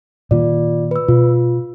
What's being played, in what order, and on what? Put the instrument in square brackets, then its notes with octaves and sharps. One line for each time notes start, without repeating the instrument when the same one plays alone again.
[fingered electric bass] A#2 D#3 A#3 [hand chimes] F4 D5
[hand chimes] B4 E6
[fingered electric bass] B2 [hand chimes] F4